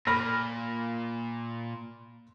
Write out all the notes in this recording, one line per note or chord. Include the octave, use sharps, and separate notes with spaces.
A#2 B5 F6 A#6